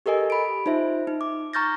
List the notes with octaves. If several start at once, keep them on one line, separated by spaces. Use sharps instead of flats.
G4 A4 A#4 D#5 G#5
B5 D7
D#4 F4 C5 E5
D#4
D6
A#5 C#6 F6 G6 A6 A#6